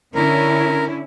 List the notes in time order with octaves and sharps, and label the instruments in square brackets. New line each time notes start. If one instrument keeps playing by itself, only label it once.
[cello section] D3 C#4 E4 [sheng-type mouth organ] A#4